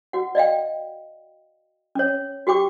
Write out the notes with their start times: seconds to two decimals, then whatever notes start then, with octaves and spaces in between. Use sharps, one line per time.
0.13 F#4 F#5
0.35 D5 D#5 F5 G5
1.95 C#4 C#5
2.47 F#4 G4 G5 D6